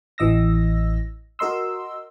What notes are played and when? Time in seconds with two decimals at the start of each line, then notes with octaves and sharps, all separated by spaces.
0.18 A1 E3 D#5 E6 A#6
1.39 F#4 A#4 D#5 C6 E6